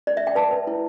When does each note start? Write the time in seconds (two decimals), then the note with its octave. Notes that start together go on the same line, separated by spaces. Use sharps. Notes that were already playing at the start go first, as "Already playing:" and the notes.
0.07 D5
0.17 E5
0.27 G5
0.35 B4 A5
0.51 B4
0.67 E4